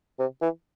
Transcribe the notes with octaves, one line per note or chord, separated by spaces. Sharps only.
C3
E3